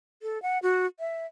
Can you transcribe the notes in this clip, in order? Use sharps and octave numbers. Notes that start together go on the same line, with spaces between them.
A4
F#5
F#4
E5